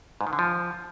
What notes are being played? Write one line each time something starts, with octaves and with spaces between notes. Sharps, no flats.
G#2
D#3
D3
F3